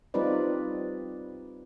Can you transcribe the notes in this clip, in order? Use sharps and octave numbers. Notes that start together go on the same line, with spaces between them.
G3 C4 D#4 F4 B4 D5